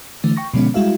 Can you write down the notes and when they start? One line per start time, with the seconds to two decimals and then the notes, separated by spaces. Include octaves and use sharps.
0.24 D3 E3 A3
0.37 G5 C#6 A#6
0.54 B2 D3 F3 G#3 B3 C#4
0.74 G3 G#3 E4 F#4 E5 F5